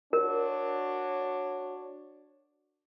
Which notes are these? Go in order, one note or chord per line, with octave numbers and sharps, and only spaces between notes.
D4 F#4 A#4 C#5